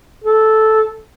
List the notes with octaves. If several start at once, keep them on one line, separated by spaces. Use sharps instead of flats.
A4